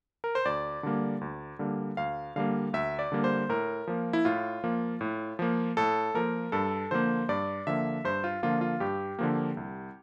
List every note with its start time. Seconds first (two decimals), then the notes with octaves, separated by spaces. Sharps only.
0.24 A#4
0.35 C5
0.45 D2 D5
0.83 D3 G3 A#3
1.21 D2
1.59 D3 G3 A#3
1.97 D2 F5
2.36 D3 G3 A#3 F5
2.73 D2 E5
2.99 D5
3.12 D3 G3 A#3
3.24 C5
3.49 A2 A#4
3.87 F3 A#3
4.13 E4
4.25 A2 F4
4.64 F3 A#3
5.01 A2
5.39 F3 A#3
5.77 A2 A4
6.14 F3 A#3 A#4
6.52 G2 A4
6.91 D3 F3 A#3 C5
7.29 G2 D5
7.67 D3 F3 A#3 E5
8.04 G2 C5
8.24 F4
8.43 D3 F3 A#3 F4
8.61 F4
8.80 G2 G4
9.19 D3 F3 A#3
9.57 C2